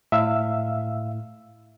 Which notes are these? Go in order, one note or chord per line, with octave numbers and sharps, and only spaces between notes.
A2 E5 F5 E6